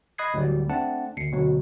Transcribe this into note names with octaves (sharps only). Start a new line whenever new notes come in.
D#5 B5 D#6 F#6 G#6 C7
D2 A2 F#3 G3
A3 C4 D4 F#5 A5
D2 C7 C#7
D2 B2 F#3